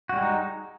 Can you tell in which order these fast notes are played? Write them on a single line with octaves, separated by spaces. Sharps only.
F#4 G3 G#3 D#4